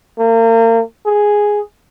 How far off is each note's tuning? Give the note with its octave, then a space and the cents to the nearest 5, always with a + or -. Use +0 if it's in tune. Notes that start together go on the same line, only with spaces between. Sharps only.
A#3 -35
G#4 +0